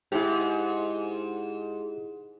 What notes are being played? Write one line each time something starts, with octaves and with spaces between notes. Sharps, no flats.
G#2 E4 G4